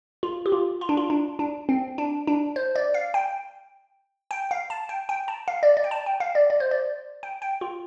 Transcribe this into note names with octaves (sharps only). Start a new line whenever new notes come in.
F4
G4
F4
F4
D4
F4
D4
D4
C4
D4
D4
C5
D5
F5
G5
G5
F5
A5
G5
G5
A5
F5
D5
D5
G5
A5
G5
F5
D5
D5
C5
D5
G5
G5
F4